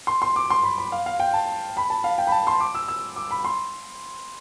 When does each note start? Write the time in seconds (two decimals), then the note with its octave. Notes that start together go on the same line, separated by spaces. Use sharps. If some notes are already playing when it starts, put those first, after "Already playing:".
0.07 C6
0.22 C6
0.36 D6
0.50 C6
0.64 B5
0.78 B5
0.92 F5
1.06 F5
1.20 G5
1.34 A5
1.77 B5
1.90 A5
2.04 F5
2.18 G5
2.27 B5
2.32 A5
2.47 C6
2.60 D6
2.75 E6
2.88 E6
3.16 D6
3.31 B5
3.45 C6